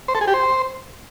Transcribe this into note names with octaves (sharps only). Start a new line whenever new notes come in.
C5
A4
G#4
G4
C5